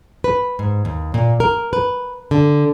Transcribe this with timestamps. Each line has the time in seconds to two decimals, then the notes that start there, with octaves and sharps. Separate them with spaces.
0.24 B4
0.59 G#2
0.85 D#2
1.14 A#2
1.40 A#4
1.73 B4
2.31 D3